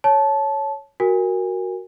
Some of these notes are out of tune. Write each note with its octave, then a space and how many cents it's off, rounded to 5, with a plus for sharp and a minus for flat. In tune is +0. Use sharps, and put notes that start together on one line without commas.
C#5 +0 A5 -15
F#4 +0 A#4 +0 G#5 -25